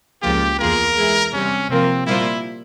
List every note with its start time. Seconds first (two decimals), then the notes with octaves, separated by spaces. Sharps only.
0.22 C#2 C#3 F3 A#3 F4 G4
0.59 E2 E3 A#3 F4 G#4 A#4
0.96 E3 G#3 E4 G#4
1.33 C3 G3 C4 C#4
1.70 C3 F3 A#3 C4 F4 A#4
2.07 A#2 G3 A#3 E4 F4 C5